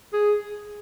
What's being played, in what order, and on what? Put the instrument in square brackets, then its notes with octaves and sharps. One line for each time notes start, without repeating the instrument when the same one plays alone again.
[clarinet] G#4